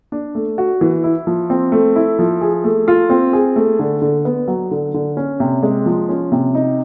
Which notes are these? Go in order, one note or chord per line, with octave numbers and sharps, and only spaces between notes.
D4
A3
F#4
E3
E4
F3
C4
A3
E4
F3
G#4
A3
F4
C4
G#4
A3
D3
D3
B3
F#3
D3
D3
C#4
C3
G#3
F3
C#4
C3
D#4